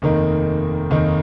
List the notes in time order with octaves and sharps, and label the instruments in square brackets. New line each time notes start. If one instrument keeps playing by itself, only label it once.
[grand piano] F1 D#2 D#3 A#3 D#4
F1 D#2 D#3 A#3 D#4